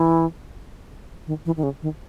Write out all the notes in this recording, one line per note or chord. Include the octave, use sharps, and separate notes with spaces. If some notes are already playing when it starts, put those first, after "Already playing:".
Already playing: E3
D#3
E3
D#3
C#3
D#3